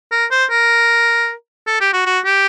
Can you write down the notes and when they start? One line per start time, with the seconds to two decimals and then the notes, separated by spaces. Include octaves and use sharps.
0.12 A#4
0.31 C5
0.50 A#4
1.67 A4
1.81 G4
1.93 F#4
2.06 F#4
2.25 G4